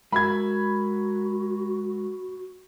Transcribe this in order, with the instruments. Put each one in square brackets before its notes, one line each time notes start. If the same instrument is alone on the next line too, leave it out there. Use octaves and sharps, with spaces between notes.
[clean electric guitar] G#3 A#4 E5 [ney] F#4 [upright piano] B5 G#6